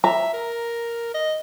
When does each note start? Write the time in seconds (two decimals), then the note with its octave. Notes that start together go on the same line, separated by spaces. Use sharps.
0.04 E5 A#5
0.34 A#4
1.14 D#5